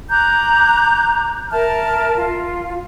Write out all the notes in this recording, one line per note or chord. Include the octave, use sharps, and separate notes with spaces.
A#5 D6 F#6 G6
A#4 E5 A5 F6
F4